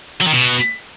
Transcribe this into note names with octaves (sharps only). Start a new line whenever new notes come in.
F#3
D#3
B2